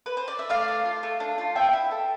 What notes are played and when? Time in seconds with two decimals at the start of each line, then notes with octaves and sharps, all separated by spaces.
0.06 B4
0.17 C5
0.28 D5
0.39 E5
0.49 A3 D5 F5
0.68 D4
0.85 F4
1.03 A3
1.20 D4
1.38 F4
1.56 B3 E5 G5
1.73 E4
1.91 A4